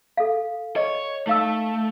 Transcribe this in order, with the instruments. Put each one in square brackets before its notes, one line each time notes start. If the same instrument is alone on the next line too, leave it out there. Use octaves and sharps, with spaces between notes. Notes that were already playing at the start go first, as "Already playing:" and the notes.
[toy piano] A4 F5
[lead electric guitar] C#5 [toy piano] D#5
[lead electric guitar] A3 [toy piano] D#4 F5 E6